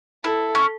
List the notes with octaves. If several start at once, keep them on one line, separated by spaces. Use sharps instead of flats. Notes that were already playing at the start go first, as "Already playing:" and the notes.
E4 A4
C#4